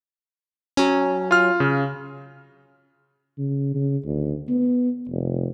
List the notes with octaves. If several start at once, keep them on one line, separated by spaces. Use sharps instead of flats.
F#3 C#4
F4 F6
C#3
C#3
C#3
D2
B3
F1